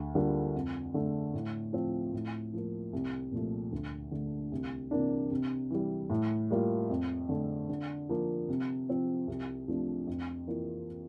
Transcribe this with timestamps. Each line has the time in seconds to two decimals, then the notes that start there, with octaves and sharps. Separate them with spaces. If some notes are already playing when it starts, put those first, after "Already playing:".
Already playing: D2
0.15 D3 G3 A#3 F4
0.54 F2
0.94 D3 A3
1.34 A2
1.73 F3 C4 F4
2.13 A2
2.53 F3 A#3
2.93 C2
3.32 A#2 F3 A3
3.72 D2
4.11 D3 A3
4.52 C2
4.91 C3 E3 A#3 D4
5.31 C3
5.70 E3 G3
6.10 A2
6.51 G3 A#3 F4
6.89 F2
7.29 D3 A3
7.69 D3
8.09 F3 A#3
8.49 C3
8.89 F3 C4 F4
9.27 C2
9.68 C3 F3 A3 D4
10.07 F2
10.47 E3 A#3 F4